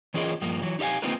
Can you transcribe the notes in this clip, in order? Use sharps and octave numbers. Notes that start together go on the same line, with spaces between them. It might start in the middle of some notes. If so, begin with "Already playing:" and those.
E3 C#4 F4 G#4 A#4 D#5
G2 F3 A#3
E3 F#3
D#4 G4 D#5 F5 G#5
A#3 C4 D#4 F4 A#4 B4